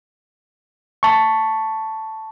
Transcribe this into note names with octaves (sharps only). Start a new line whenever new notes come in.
A5 C#6